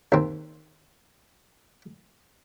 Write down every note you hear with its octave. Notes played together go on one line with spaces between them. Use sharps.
D#2 C4